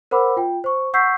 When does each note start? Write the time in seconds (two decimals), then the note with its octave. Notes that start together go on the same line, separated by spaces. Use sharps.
0.11 A#4 C5 F#5 B5 D6 E6
0.37 F4 G5
0.64 C5 C#6
0.94 F#5 C#6 E6 G6 B6 C7